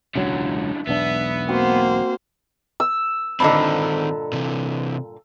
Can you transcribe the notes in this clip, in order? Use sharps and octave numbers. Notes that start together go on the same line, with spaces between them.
E1 C#2 F#2 D3 F#3
E1 B1 B3 D4 E5
A#3 C4 F#4 C5
E6
G2 A#2 D3 D#3 C4 D#5 B5
C3 E3